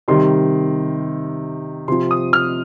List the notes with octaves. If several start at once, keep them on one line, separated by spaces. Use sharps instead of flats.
C3 D#3 G3 C6
C3 F3 C6
D#6
F6